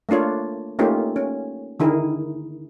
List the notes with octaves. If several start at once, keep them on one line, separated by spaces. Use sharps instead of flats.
A3 A#3 D4 F4 C#5
A3 A#3 C#4 D#4 F4 G4
C#4
D3 D#3 E4 G#4 A#4